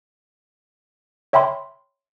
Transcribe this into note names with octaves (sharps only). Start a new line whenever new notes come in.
C#5 E5 G5 B5 C6